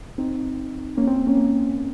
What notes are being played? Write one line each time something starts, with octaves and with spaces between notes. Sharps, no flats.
C4 D#4
A#3 C#4
C4
A#3 C#4
A#3